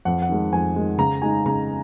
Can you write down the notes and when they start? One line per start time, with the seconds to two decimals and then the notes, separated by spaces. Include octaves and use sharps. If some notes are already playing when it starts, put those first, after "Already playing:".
0.05 F2 F#5
0.22 F#5
0.29 D#3 G#3
0.53 F2 G#5
0.76 D#3 G#3
0.98 C#3 A#5
1.22 G#3 D#4 G#5
1.46 C#3 A#5